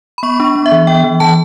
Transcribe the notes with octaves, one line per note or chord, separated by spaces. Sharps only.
B5
B3 C#6
D4
C#6
B3
E5
E3
B3 G5
E3
E3 A5